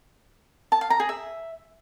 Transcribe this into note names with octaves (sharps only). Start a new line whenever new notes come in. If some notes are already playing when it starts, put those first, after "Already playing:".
A5
F5
A#5
G#4
E5